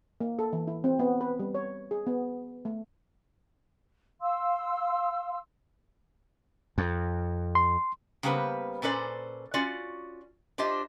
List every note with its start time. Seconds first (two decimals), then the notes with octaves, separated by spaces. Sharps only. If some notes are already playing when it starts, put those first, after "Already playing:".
0.21 A#3
0.39 A4
0.53 E3
0.67 E4
0.84 C4
0.99 B3
1.21 B4
1.39 G3
1.55 C#5
1.91 G#4
2.07 B3
2.65 A3
4.22 F5 C6 E6
6.78 F2
7.55 C6
8.23 C#3 G3 A#3 B3 B4 C5
8.82 A#2 C#4 A4 B4 C5 D5
9.54 C#4 F4 F#4 D5
10.58 D4 F4 G4 C5 D#5